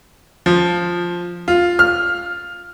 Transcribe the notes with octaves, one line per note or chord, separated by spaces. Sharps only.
F3
F4
F6